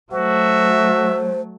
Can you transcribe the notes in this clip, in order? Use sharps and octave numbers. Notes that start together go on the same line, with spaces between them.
F#3 A3 F#4 C5 E5